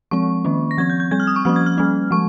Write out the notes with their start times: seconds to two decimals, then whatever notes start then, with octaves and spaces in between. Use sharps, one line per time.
0.11 F3 G#3 C4 C#6
0.45 D#3 A#3 C#4
0.71 A#6
0.78 F3 C4 G#6
0.90 G6
1.00 G6
1.11 G3 C4 G#6
1.20 F6
1.27 D#6
1.36 C#6
1.45 F3 A#3 C#4 F6
1.56 G#6
1.66 F6
1.78 G3 A#3 C#4
2.11 F3 G#3 C#6